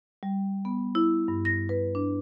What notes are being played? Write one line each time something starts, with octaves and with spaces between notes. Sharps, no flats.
G3
B3
E4
G2
A#6
B4
D4